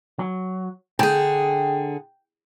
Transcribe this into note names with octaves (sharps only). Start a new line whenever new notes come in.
F#3
D3 G#4 G5